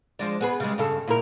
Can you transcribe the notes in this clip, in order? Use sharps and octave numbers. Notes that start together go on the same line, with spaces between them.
F3 G#3 D4
B3 G#4 B4
C#3 G3 G#3
G2 C#3 A4
A#2 E4 A#4